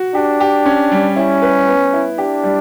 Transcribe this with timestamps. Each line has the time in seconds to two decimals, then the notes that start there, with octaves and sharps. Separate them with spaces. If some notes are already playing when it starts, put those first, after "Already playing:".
Already playing: F#4
0.15 D4 G4
0.41 G4
0.66 C#4
0.92 G3
1.16 C#4 E4
1.42 B4
1.68 B3
1.94 E4
2.18 D4 G4
2.44 G3